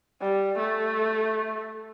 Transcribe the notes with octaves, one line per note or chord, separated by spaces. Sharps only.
G3
A3